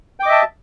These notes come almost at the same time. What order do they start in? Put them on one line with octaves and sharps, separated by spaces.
G5 D6 D#5 E5 A5